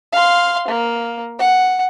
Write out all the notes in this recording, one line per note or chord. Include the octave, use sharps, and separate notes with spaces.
F5 C6
A#3
F#5